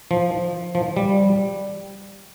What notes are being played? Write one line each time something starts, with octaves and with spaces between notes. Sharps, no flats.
F3
F3
G3